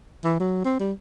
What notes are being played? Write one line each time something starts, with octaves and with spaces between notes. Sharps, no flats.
E3
F#3
C4
G3